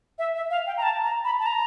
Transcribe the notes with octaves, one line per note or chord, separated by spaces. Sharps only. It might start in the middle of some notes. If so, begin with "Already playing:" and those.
E5
E5
F5
G5
A#5
A5
A#5
B5
A5
A#5